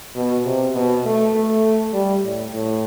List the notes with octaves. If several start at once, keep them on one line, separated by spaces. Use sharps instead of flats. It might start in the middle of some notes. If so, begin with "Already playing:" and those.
B2
C3
B2
A3
A3
G3
A2
A2